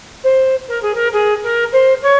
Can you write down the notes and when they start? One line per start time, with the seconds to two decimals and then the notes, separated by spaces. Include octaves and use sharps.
0.23 C5
0.68 A#4
0.82 G#4
0.94 A#4
1.12 G#4
1.43 A#4
1.72 C5
2.02 C#5